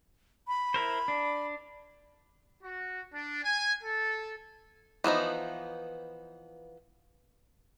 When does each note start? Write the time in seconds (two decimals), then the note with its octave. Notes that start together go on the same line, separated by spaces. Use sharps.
0.48 B5
0.74 E4 A#4 C5
1.08 D4
2.63 F#4
3.13 D4
3.43 G#5
3.83 A4
5.04 E3 F3 B3 D#4